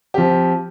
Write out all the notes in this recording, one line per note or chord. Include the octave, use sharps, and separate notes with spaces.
F3 C4 G4